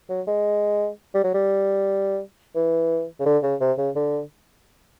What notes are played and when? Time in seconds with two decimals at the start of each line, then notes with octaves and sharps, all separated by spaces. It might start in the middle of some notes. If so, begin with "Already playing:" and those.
0.09 F#3
0.27 G#3
1.15 G3
1.24 F#3
1.34 G3
2.55 E3
3.20 C#3
3.26 D3
3.43 C#3
3.61 C3
3.78 C#3
3.96 D3